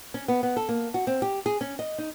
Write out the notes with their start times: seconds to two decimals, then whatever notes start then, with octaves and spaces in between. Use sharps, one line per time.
0.14 C#4
0.28 B3
0.43 B3
0.57 A4
0.69 A#3
0.94 F#4
1.07 C4
1.22 G4
1.46 G#4
1.61 C#4
1.79 D#5
1.98 D#4